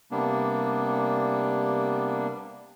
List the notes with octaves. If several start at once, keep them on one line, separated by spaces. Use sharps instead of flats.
C3 G3 A#3 B3 D4